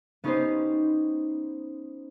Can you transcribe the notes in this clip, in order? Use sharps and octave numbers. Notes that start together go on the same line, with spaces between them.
B3 C#4 D#4 G4 B4 C5